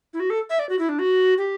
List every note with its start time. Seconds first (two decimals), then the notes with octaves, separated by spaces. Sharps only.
0.13 E4
0.20 F#4
0.30 A4
0.50 E5
0.59 D5
0.69 F#4
0.79 E4
0.89 D4
0.99 F#4
1.38 G4